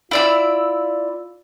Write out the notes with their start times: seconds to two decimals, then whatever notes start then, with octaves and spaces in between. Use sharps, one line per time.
0.11 E4 F4 D5 E6